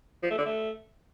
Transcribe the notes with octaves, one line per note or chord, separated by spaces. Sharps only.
F3
A3
D3
A3